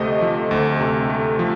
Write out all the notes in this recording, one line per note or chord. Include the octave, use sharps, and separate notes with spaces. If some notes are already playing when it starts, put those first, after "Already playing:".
Already playing: D2 C3 A3 G4 C5 D#5
F3
D2
C3
A3
F3